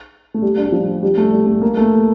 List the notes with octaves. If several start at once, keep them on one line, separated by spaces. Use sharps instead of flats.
A3
G3
D4
G3
F3
G3
A3
G3
A3
A#3
A3